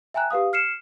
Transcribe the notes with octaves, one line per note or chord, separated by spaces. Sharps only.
E5 G5 G#5 A#5 F#6
G4 B4 F5 D#6
F6 C7 C#7 E7